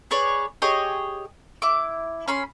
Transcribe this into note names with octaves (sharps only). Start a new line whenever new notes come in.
G#4 B4 C#5 D5
G4 G#4 C#5 D#5
E4 D6
C#4 B5 C6